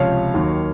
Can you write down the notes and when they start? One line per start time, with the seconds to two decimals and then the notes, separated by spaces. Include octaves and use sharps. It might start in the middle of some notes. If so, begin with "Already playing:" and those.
Already playing: C#2 C3 F3 C#5 F5
0.34 D#2 D#3 F#3